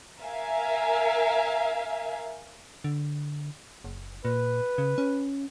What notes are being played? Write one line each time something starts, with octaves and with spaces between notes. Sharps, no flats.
A#4 E5 F5 G#5
D3
F#1
A#2 B4
C#3
C#4